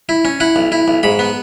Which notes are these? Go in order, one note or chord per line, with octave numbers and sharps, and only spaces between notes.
E4
C#4
E4 F#5
B1
E4
B1
G#2 B5
B3